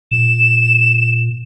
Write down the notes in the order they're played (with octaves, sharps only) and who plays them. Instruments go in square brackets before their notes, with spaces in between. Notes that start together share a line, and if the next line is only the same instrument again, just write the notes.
[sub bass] A#2 [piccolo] E7